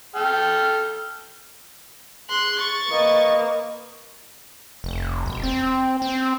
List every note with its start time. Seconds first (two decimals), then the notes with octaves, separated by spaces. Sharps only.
0.16 A4 G5 F6
2.30 G#4 C6 F#6
2.59 C#6 A6
2.89 A#3 B4 D#5
4.84 F1
5.26 E1
5.43 C4
6.02 C4